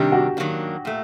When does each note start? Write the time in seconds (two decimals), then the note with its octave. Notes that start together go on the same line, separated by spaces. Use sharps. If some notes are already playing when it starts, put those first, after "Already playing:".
Already playing: C3 D#3 G3 D4 G4
0.12 F#4
0.37 D#3 F#3 A#3 D4
0.85 A#2 A3